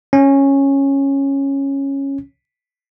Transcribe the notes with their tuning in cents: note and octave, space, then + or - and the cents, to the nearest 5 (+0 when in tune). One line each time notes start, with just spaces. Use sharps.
C#4 -10